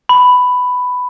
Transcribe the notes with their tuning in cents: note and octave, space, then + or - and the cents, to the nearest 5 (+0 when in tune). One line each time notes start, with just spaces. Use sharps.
B5 +10